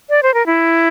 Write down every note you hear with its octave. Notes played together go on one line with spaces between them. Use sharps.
D5
C5
A#4
E4